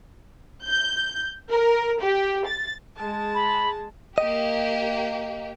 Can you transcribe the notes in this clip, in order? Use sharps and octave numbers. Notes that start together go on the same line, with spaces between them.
G6
A#4
G4
A6
G#3 A5
B5
A#3 G4 D#5